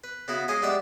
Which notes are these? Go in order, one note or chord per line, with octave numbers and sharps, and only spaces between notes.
B4
C#3 B3 E4 F#4 B4
G#3 C#4 G#4 D#5 F5
G3 G#3 B3 D4 D5 E5